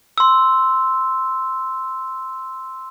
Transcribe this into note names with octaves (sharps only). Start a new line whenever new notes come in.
C6 E6